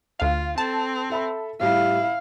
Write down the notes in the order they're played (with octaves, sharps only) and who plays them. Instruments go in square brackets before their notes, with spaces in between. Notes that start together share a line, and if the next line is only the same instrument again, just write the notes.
[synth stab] D2 F5 [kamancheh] F4
[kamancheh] C4 [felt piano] A4 [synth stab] A5
[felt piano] A4 E5 B5
[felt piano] A2 G3 [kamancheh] E4 [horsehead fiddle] F5